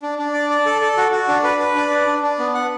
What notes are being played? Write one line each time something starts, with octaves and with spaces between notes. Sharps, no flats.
D4
D4
D5
D5
A4
A4
F#4
F#4
D4
B4
B4
D4
D5
D4
D4
B3
F#5